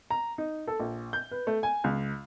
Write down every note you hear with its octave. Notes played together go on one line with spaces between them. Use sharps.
A#5
D#4
A4
A#1
G6
B4
A3
G#5
C#2